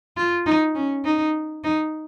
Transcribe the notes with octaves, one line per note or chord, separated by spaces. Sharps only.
F4
D#4
C#4
D#4
D#4